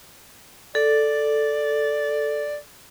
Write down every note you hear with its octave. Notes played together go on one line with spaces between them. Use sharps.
A4 D5